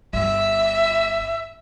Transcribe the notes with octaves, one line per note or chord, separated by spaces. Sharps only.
G1 E5